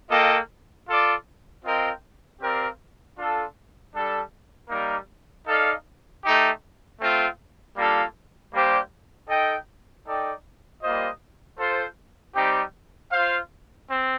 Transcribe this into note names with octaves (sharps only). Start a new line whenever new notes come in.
A#3 F4 A4 D#5 G5
F4 A4 D5
C4 F4 A#4 D#5 G5
C4 G4 A#4 D5 F5
D4 F4 A4
G3 D4 A4
G3 A#3 D#4 A#4 D5
D#4 A4 D5 F5
A3 D#4 G4
A3 C4 F4
G3 A#3 D4 F4 A4
G3 A#3 D4 G4 C5
D#4 A4 D#5 G5
D#4 A4 D5 G5
G3 A#3 F4 C5 D#5
F4 A4 C5
G3 C4 D#4 G4
F4 C5 F5
C4